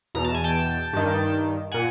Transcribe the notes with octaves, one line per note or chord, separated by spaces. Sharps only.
E2 B2 A#5
A5
G#5
G5 A5
G2 D#3
A#2 F#5 G#5